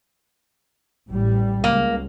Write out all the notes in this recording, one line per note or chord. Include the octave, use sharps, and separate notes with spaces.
A1 G3
C#2 A#3